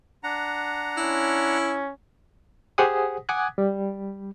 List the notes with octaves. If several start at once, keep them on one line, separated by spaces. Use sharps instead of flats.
D4 F#5 A#5
C#4 E4
G4 G#4 C5 F#5 G#5 D#6
F#5 G#5 D6 D#6 F#6 G#6
G3